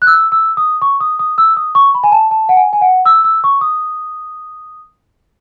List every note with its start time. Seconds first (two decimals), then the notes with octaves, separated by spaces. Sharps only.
0.02 F#6
0.07 E6
0.32 E6
0.57 D#6
0.82 C#6
1.01 D#6
1.19 D#6
1.38 E6
1.57 D#6
1.75 C#6
1.95 B5
2.04 G#5
2.12 A5
2.31 A5
2.49 F#5
2.56 G#5
2.73 G#5
2.81 F#5
3.06 E6
3.24 E6
3.44 C#6
3.61 D#6